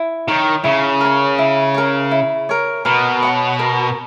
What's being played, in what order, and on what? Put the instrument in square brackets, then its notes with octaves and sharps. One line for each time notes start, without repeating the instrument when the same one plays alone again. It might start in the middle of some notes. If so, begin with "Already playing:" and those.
Already playing: [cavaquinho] E4
[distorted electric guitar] D#3 [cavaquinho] A#4 C#5
[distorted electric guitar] C#3 [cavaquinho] E4
[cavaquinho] A#4 C#5
E4
A#4 C#5
E4
A#4 C#5
[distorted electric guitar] B2 [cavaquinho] A#4
[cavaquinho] C#5 F#5 C#6
A#4